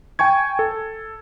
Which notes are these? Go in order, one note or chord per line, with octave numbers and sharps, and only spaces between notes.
G5 G#5 C#6 G#6
A4